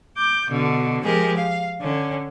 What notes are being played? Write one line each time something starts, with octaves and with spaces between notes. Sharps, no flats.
D6 G6
B2 D3
F3 G#3 G4 G#4 A#4
F5
D3 C#4